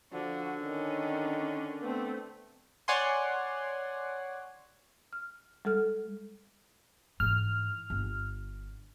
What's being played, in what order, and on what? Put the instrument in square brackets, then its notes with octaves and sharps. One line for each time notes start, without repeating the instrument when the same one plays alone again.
[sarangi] D3 [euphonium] F3 [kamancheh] F#4
[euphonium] D#3 [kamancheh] C#4
[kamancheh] A3 C4 [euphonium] B3
[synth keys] C#5 D5 F#5 G#5 C6
[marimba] F6
G3 G#3 A4 F6
[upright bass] G#2 E3 [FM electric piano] F6
[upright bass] G1